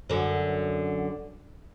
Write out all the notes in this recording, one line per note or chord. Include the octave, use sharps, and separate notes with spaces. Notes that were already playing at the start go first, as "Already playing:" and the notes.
F#2 D3